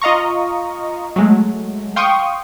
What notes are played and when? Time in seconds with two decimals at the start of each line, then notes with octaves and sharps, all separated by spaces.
0.02 F4 D#5 F5 A#5 C#6
1.16 F#3 G#3 A3
1.96 F5 G5 C6 C#6 D#6